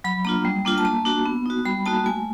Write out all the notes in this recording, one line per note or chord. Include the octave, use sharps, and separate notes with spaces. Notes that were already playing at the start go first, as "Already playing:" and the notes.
F#3 B5
A#3 D4 F4 A#5
G3
A#3 D4 F4
A5
A#3 A#5
D4 F#4
B3
D#4 F#4
G3 B5
A#3 D#4 F#4 A5
A3 G#5